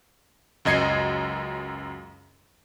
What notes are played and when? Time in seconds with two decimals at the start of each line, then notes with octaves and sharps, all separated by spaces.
0.65 C#2 F#2 D#5 G#6 C7 C#7